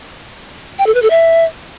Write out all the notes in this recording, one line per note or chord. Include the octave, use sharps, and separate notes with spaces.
G5
A4
B4
A4
E5